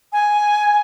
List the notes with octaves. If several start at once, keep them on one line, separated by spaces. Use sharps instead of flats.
G#5